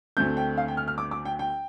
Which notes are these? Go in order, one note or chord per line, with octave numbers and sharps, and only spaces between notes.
D2 D3 A3 C4 G6
G5
F5
G5
F6
F6
D6
D6
G5
G5